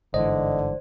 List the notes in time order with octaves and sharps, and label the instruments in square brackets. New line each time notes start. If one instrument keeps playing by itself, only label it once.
[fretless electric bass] G1 G#2 E3 [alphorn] D3 [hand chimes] C5 D5 [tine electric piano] D#5